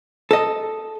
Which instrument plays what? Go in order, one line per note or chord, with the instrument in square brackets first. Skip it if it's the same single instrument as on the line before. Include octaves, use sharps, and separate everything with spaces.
[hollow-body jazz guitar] A4 D#5